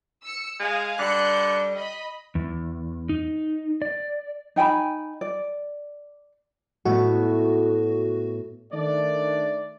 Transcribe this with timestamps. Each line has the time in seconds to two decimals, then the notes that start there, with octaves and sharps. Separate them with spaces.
0.23 E6 C#7
0.59 G#3 G#4 F5
0.99 D3 G3 F#6 G6 C#7
1.74 D#5 B5
2.35 E2
3.09 D#4
3.82 D5
4.56 D#4 G5 G#5 B5
5.21 D5
6.85 A2 A3 B3 F#4
8.73 D#3 A3 D4 D5